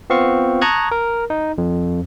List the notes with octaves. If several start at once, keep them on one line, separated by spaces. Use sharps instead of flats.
B3 C4 F4 F5 C#6
A5 A#5 C#6 D#6 F#6 G#6
A#4
D#4
F2